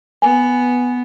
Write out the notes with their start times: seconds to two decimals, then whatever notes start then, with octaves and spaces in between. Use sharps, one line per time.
0.22 B3 G#5